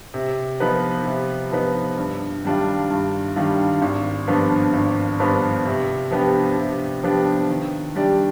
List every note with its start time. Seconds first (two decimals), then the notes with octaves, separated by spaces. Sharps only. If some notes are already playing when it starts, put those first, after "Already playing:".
0.14 C3
0.60 F3 B3 D#4 B4
1.06 C3
1.52 F3 B3 D#4 B4
1.97 G2
2.44 D#3 G3 D4 F4
2.90 G2
3.36 D#3 G3 D4 F4
3.82 G#1
4.28 G2 F3 B3 D4
4.73 G#1
5.19 G2 F3 B3 D4
5.65 C3
6.11 F3 B3 D4 G4
6.58 C3
7.03 F3 B3 D4 G4
7.49 D#3
7.95 G3 D4 G4 D5